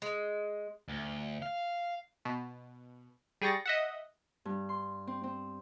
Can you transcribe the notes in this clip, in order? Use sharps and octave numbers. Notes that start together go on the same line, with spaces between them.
G#3
D2
F5
B2
G3 G#4 G5 C#6 A6 A#6
D#5 E5 F#5
G2
C6
C4
C4